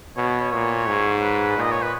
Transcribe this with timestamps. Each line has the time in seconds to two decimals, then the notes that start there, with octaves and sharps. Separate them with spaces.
0.17 B2 C#5
0.29 C#5
0.40 C#5
0.51 A#2 C#5
0.88 G#2
1.23 B4
1.57 A#2 D#5
1.72 C#5
1.82 B4